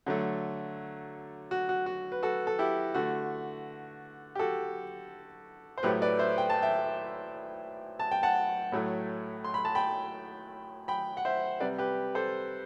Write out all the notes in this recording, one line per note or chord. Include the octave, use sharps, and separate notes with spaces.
D3 F#3 A3
F#4
F#4
F#4
B4
F#4 A4
A4
E4 G4
D3 A3 F#4
G4
F#4 A4
C5
A2 F#3 A3 G4 B4
B4 D5
C5 E5
G5
A5
E5 G5
A5
G5
F#5 A5
A2 F#3 A3
C6
B5
A5
G5 B5
G5 B5
F#5
C5 E5
C3 G3 B4 D5
G4 B4
A4 C5